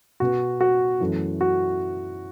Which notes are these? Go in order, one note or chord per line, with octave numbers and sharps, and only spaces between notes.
B2 B3 F#4
F#4
F#2 E3 A3
F#4